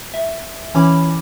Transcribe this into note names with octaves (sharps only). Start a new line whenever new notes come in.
E5
E3 C#4 E4 C#5 B5 D6